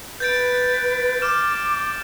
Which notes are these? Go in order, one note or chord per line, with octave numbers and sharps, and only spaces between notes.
B4 G6 A6 D7
D6 F6 E7